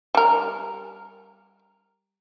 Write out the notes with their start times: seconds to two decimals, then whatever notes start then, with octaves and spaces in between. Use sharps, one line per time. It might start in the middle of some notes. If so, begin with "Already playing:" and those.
0.15 G3 A#4